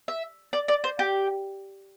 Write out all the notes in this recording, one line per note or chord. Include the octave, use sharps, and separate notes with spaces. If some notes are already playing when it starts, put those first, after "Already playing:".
E5
D5
D5
C5
G4